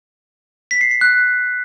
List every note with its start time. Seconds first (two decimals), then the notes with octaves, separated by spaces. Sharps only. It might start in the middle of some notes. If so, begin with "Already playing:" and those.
0.71 B6
0.81 C7
0.91 C7
1.01 F#6